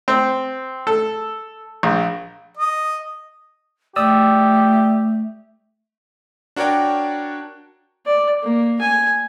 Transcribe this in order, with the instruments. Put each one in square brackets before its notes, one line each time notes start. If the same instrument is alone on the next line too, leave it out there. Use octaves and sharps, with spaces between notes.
[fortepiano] C4
A4
A#1
[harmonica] D#5
[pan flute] A3 [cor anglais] G4 [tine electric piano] D5 D#6 E6
[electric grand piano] D4 F#4 A#4 C#5 D5 G5
[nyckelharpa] D5
A#3
G#5